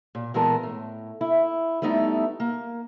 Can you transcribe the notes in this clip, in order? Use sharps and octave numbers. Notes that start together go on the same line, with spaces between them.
A#2
A#2 E3 G#3 B3 A#4 A5
A2
E4
G3 A3 B3 D#4 E4
A#3